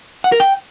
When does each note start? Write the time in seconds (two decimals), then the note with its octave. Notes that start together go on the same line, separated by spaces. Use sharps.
0.24 F#5
0.32 A#4
0.40 G5